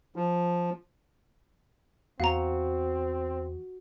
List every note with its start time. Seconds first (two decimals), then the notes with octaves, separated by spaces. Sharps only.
0.16 F3
2.20 E2 C4 F#4 F5 A#5